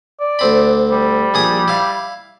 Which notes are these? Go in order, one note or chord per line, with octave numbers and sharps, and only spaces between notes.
D5
D2 C4 B5
G3
A#1 G#4 D#6
E4 F5